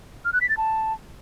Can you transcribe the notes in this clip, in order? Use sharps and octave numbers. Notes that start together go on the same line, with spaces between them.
F6
F#6
B6
A6
A5